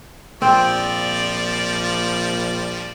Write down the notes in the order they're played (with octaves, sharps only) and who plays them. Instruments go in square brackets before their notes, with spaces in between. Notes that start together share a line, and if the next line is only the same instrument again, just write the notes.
[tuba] A#1 [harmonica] F3 G3 D5 [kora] C4